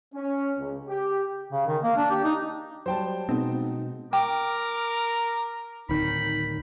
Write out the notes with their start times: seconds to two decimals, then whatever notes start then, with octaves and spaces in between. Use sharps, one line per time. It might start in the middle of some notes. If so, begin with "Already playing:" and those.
0.15 C#4
0.59 C#2
0.88 G4
1.52 C#3
1.67 D#3
1.83 A#3
1.96 D4
2.10 G4
2.24 D#4
2.86 F#3 G3 C5 G5 A5
3.29 B2 G#3 B3 C4 D#4
4.13 A#4 G5 D6
5.89 D1 D#3 D#4 B5